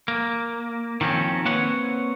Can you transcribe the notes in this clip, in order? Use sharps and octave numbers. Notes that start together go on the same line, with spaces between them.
A#3
D#3 F3 C4 C#4
A#3 C4 B4 C#5 F#5